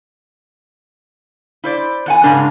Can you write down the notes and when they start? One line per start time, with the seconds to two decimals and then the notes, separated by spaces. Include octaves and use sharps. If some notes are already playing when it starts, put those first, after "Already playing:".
1.64 E4 C5 D5
2.06 E2 F#5 G#5
2.23 G#2 C#3 G#3 D4 A#4